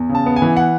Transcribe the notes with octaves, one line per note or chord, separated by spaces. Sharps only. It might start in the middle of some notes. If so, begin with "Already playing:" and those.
Already playing: E2
C#3
A5
B3
G#5
E3
F#5